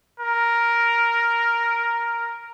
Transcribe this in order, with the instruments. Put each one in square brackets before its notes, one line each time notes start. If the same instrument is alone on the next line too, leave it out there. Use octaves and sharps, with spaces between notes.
[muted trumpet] A#4